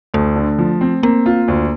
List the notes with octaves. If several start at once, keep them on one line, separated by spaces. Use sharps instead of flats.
D2 A3
D3
F3
C4
A#3 C4
F4
D2